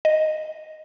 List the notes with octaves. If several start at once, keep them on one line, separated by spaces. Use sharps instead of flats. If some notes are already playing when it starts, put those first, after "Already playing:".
D#5